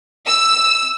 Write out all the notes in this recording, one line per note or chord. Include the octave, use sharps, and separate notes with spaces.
E6